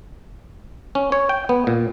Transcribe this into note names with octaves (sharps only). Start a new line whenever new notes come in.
C#4
C#5
G5
B3
A#2